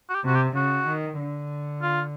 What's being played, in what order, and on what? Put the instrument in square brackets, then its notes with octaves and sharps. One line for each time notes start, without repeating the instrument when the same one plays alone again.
[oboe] F#4
G4
[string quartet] C3 [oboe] F#4
[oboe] G4
[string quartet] C#3 [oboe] F#4
[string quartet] D#3
D3
[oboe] F4